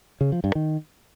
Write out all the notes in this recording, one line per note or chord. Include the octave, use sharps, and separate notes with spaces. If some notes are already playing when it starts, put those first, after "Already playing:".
C#3
F3
G2
D#3